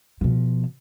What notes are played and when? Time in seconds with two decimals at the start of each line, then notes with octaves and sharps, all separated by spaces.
0.21 B2 F3